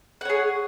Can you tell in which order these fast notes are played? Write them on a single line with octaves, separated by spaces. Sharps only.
F#5 C#5 G#4